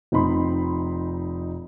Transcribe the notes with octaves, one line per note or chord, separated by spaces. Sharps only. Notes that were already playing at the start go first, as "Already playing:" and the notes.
F1 C4 D#4 B5 C6